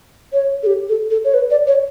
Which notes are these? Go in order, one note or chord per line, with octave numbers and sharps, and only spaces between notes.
C#5
A4
G4
A4
A4
C#5
B4
D5
C#5